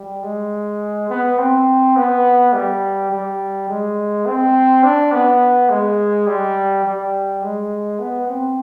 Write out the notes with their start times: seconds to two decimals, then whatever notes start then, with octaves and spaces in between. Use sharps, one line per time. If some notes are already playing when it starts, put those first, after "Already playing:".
Already playing: G3
0.23 G#3
1.10 B3
1.39 C4
1.96 B3
2.53 G3
3.11 G3
3.69 G#3
4.26 C4
4.84 D4
5.12 B3
5.70 G#3
6.27 G3
6.84 G3
7.43 G#3
8.00 B3
8.29 C4